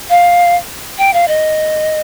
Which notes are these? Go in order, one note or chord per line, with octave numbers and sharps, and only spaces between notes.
F5
G5
F5
D#5